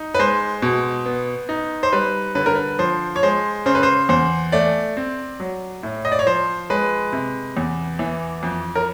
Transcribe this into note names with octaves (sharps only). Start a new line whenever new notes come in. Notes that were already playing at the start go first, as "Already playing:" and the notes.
Already playing: D#4
B4
G#3 C5
B2
B3
D#4
C5
G3 B4
D3 B4
A#4
B4
F3 C5
C#5
G#3 C5
C#3 C5
B4
C5
E2 C5
A3 D5
C4
F#3
A2
D#5
D5
C#5
F3 C5
G#3 B4
C3
E2
E3
F2
A#4